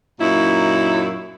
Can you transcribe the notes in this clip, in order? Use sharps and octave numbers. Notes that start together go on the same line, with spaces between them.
F#2 A#2 D#4 E4